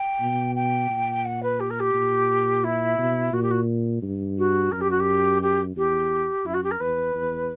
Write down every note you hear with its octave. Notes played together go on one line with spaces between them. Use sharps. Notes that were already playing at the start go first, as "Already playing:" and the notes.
Already playing: G5
B2
G5
A#2
F#5
B4
G4
A#4
G4
A#2
E4
B2
A#2 F#4
G4
F#4
G2
F#4
F#2 A#4
G4
F#4
G4
G4
E2 G4
F#2 E4
F#4
G4
A#4
E2 B4
E2